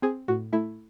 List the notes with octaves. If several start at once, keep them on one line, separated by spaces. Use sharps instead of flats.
C4 G#4
A2 F#4
A3 E4